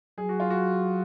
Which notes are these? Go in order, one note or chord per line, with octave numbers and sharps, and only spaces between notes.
F#3 G#4
F#4
F4
F#4